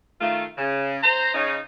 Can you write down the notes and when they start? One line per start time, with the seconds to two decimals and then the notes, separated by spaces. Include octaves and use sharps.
0.21 D#3 A3 F4
0.58 C#3
1.03 C5 A#5
1.34 C#3 D#4